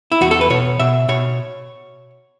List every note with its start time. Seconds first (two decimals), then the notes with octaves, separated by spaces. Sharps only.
0.12 E4
0.21 E2 F#4
0.31 A4
0.41 B4
0.50 B2 C#5
0.80 B2 E5
1.08 B2 C#5